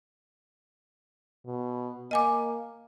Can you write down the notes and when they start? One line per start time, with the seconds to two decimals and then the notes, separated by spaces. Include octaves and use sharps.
1.46 B2
2.11 A#3 D#5 G#5 D6